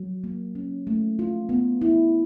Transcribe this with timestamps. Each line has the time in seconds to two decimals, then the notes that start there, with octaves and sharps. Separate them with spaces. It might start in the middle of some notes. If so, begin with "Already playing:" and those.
Already playing: F#3
0.24 A#3
0.55 C#4
0.87 A3
1.19 F4
1.49 B3
1.82 E4